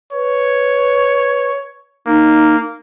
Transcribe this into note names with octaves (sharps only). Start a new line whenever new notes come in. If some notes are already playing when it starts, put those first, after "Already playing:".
B4 C#5
A#3 D#4